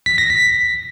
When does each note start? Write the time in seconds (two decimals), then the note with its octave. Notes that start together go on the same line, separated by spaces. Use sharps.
0.06 B6
0.18 A#6
0.30 B6